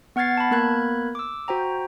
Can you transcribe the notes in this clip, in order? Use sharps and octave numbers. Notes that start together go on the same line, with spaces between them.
B3 F#5 F6 G#6 A6 C7
A5 B5
A#3 B3 A#4 B5 F#6 G#6
D6 E6
F#4 C5 G5 A#5